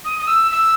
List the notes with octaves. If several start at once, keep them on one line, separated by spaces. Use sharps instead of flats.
D#6
D#6
E6
E6